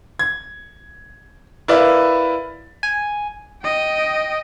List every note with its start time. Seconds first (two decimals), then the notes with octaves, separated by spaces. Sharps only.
0.19 G#6
1.68 E4 A#4 B4 D5 E5 F5
2.83 G#5
3.63 D#5 G5